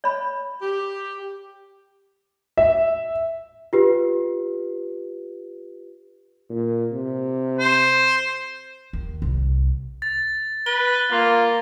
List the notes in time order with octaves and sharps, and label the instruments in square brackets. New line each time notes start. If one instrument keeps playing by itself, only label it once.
[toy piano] C#5 B5
[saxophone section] G4
[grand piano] E5
[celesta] F4 G4 B4
[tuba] A#2
C3
[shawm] C5
[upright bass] D#2
C2
[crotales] A6
[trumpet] B4 [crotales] G7
[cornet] A#3 [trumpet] F4